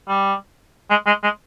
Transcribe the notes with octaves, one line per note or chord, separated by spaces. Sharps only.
G3
G#3
G#3
G#3